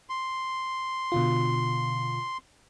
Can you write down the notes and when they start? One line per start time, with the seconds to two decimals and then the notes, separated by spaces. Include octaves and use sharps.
0.09 C6
1.12 B2 D3 F4